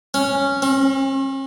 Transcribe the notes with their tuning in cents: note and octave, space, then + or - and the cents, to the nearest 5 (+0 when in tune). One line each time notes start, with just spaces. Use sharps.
C#4 -5
C#4 -45